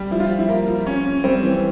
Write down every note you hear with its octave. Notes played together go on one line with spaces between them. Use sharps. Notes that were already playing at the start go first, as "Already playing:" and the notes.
Already playing: G3
F3 E4
F4
F3
E4
A#3
F3
C#4
C#4
G3 C4
E3